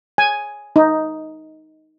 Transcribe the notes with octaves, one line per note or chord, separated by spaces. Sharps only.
G#5
D#4